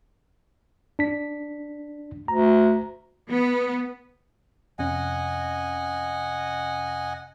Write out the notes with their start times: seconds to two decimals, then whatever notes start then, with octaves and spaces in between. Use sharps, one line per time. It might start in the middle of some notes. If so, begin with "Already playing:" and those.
0.99 D4 B6
2.28 D2 A#5
3.30 B3
4.79 F2 C3 C#4 D#5 F#5 G#5